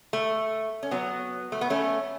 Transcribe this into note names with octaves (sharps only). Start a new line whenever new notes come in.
A3
C#4
F#3 B3
A3
B3
A3 C#4